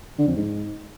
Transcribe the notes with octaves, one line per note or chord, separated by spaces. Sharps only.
D3
F2
G#2